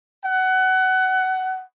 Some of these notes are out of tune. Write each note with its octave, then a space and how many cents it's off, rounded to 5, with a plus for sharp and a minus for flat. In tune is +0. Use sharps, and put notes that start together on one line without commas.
F#5 +20